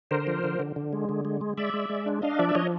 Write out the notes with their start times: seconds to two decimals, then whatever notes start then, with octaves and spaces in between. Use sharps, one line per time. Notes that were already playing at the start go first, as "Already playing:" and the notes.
0.11 D3 A#4 C5
0.27 F3
0.43 D3
0.59 D3
0.76 D3
0.93 G#3
1.09 D3
1.25 G#3
1.41 G#3
1.58 G#3 D5 E5
1.74 G#3
1.89 G#3
2.06 D4
2.22 D4 D#5 F5
2.39 F3 D5 E5
2.49 E5
2.55 F3 C#5 D#5